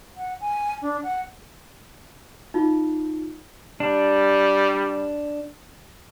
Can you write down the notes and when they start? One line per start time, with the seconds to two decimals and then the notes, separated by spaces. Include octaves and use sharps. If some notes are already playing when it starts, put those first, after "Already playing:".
0.17 F#5
0.41 G#5
0.82 D4
1.03 F#5
2.54 D#4 F4
3.80 G3 D4